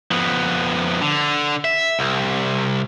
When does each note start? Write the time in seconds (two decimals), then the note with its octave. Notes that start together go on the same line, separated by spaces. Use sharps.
0.11 F2 B3
1.02 D3
1.65 E5
1.99 C2